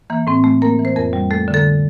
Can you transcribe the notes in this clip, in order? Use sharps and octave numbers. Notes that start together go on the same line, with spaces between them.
E3 A#3
A2 C4
A3
A#3 A#4
E3
C5
F2 A#4
G3
A3 A4
D3
A4